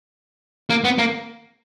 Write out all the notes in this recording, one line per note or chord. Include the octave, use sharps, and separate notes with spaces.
A#3
B3
A#3